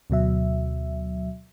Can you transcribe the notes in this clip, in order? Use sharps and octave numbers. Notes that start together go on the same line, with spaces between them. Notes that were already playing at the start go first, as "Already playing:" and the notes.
D2 B2 F#3 E5